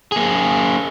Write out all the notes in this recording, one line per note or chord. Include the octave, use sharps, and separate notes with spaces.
A#3 G#4